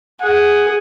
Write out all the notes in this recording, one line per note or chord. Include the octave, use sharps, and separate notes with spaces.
G#4 F#5